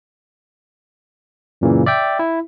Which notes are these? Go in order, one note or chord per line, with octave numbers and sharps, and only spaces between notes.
F#2 A#2 C#3 E3
D5 E5 G5
E4